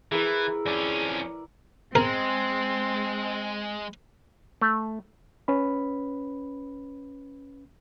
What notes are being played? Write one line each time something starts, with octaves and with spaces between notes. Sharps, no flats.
E3 E4 G#4 A#4 B4
F2 C#4 D5
G#3 C4 A#4
A3
C#4 B4 B5